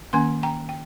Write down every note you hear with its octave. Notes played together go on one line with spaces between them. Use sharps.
D#3 A#3 C#4 G#5 C6
G5 A#5
G5